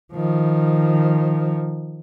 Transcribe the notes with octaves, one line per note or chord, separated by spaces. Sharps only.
D#3 F3